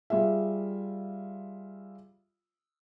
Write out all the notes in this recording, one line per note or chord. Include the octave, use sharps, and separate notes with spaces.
G3 F4 G#4 E5